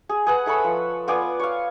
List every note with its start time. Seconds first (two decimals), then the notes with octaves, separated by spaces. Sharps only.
0.09 G#4
0.27 G#4 B4 F#5
0.46 E4 A4 C#5 B5
0.64 F3
1.08 B3 F4 D5 G#5
1.39 C#5 F5